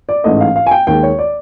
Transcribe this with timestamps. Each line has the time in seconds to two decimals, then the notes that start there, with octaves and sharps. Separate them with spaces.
0.09 D5
0.24 A1 G#2 E3 A3 D#5
0.40 F5
0.56 F5
0.66 G#5
0.71 G5
0.87 D#2 D#3 G#3 G5
1.03 C#5
1.19 D5